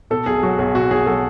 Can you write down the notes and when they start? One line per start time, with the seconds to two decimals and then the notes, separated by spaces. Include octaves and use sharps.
0.10 B2 A4
0.26 B1 G#4
0.43 F#3 F#4
0.59 B1 G#4
0.74 B2 F#4
0.91 B1 G#4
1.06 F#3 A4